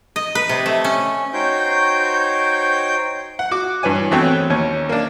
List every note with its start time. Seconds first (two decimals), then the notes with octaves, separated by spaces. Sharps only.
0.16 D#5
0.35 B4
0.49 C3
0.66 A3
0.84 C#4
1.33 D#4 F#4 C5 C#5 G5 G6
3.39 F#5
3.51 F#4 D6
3.83 G2 E3 C#5 G#5
4.11 E2 A3 C4 F#4 C#5 G5
4.50 D#2 C#4 C#5
4.89 A#3 D4